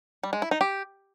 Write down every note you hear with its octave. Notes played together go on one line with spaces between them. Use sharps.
G3
G#3
E4
D#4
G4